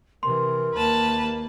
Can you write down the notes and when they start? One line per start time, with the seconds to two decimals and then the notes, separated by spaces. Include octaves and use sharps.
0.23 C3 E3 A#4 C6
0.74 D#2 A#3 B4 A5